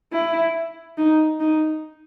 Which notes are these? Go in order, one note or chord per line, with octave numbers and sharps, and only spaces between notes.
E4
D#4
D#4